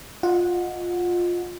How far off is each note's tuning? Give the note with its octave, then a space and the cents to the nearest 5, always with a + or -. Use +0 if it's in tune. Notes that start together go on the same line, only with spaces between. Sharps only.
F4 +10 D#5 +0 F#5 -15